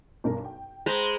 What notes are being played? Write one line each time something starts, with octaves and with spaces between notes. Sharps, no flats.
B1 G2 A#4
G5
G#3 B4 C5 A#5